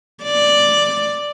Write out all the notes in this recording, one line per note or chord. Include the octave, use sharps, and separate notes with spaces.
D5